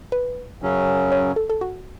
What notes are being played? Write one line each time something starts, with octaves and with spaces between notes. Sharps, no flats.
B4
F#2 C#3 F#3 C#4
C#5
A4
A4
F#4